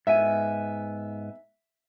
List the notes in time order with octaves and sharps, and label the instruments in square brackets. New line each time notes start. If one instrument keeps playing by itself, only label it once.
[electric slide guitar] G#2 B3 G#5 [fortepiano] E5